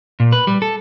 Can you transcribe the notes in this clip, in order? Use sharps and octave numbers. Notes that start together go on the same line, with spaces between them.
A#2
B4
G3
A4